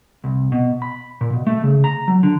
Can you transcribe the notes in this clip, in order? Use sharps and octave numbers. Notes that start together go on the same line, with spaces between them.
C2
B2
B5
A#2
B2
A3
C#3
A#5
F#3
D3